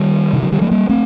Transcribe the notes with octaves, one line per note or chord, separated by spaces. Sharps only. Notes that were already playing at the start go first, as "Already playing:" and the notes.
Already playing: D#3 G3
C3 D#3
D3 F#3
D#3 G3
F#3 A3
G3 A#3
A3 C4